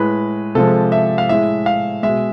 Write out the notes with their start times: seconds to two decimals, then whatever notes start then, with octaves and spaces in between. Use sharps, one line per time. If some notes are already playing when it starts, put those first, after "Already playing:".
Already playing: A2 G#3 B4
0.55 C3 F3 G#3 A4
0.92 E5
1.18 F5
1.29 A2 G#3 E5
1.66 F5
2.03 B2 G#3 E5